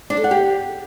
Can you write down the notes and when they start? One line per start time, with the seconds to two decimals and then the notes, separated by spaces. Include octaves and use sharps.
0.10 D4
0.17 A4
0.24 F#5
0.31 G4